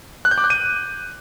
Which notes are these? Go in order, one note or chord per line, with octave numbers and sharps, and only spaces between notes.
F#6
G6
D6
F#6
D#7